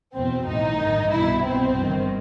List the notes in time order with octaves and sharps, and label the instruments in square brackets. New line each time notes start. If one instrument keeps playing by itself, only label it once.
[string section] E2 B2 C4
B1 A2 E3 D#4
A1 G2 D#3
C2 B2 E4
C2 B2 C4
G1 G2 D#3